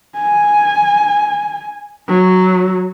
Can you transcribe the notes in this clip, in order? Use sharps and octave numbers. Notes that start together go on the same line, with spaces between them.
G#5
F#3